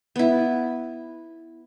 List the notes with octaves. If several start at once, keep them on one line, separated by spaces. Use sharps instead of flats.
B3 E4